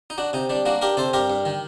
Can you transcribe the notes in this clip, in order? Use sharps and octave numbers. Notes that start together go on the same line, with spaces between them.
D#4
D4 F#4
C3 D#4
G3 D4
A#3 D4 F#4
D4 G4 A#4
C3 A4 C5
G2 G4 A#4
G2
D#3